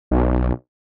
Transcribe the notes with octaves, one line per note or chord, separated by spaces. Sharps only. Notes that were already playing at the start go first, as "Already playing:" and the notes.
B1